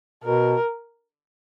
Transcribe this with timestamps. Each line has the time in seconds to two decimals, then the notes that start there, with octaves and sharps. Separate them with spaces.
0.24 B2 A#4